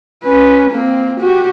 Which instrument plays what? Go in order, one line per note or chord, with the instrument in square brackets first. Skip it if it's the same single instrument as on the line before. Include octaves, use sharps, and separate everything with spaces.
[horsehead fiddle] C#4 B4
A#3 C4
F#4 G4